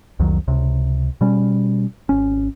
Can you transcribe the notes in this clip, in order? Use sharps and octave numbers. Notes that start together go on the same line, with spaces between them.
C2 F2 D#3 F#3
C#2 C3
B2 G3 C#4
G#1 C#4